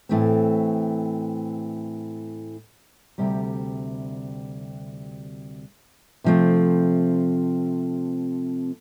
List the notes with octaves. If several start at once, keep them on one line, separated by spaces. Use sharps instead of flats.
A2 E3 A3 C4
D2 C3 G3
C3 F3 A3 C4